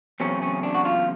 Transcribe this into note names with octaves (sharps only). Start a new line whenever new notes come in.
E2 C#3 F#3 A3 C4 C#4
C#4
D4
F#4
F4